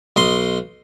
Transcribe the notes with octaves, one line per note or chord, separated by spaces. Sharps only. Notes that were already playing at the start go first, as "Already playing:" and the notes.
B1 D#5 C6